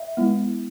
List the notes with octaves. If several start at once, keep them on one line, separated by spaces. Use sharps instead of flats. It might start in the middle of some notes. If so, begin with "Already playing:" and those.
Already playing: E5
G#3 B3 E4